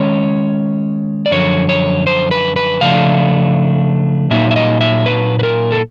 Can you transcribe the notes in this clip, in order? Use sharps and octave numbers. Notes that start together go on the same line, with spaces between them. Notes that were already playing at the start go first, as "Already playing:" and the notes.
Already playing: D#3 G#3 C#4 C#5
D5
F#2 D3 F3 C#5
C#5
C5
B4
B4
C#3 F3 A3 D4 F5
A#2 F#3 A#3 D#4 E5
E5
D#5
E5
B4
B4
A#4
A4